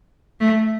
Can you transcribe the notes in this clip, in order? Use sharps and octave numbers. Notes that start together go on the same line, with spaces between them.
A3